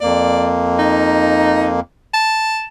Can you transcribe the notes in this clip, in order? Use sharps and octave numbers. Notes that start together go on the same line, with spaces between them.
F2 A#3 D5
D#4
A5